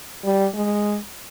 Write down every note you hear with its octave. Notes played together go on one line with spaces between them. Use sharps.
G3
G#3